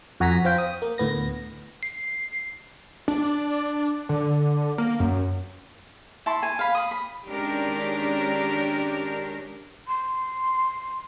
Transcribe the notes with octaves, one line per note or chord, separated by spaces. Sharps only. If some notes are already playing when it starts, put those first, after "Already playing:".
F2 F#4 G#5 A#5 A#6 B6
F3 C4 F4 G5 B6
D#6
A#3
D2 A2 B3 A#6
C7
D4
D3
A#3
F#2
E4 A5 C6 C#6
G#5
F5 B5
B5 D#6
B5
D#3 G#3 C#4 D4 G4 A#4
C6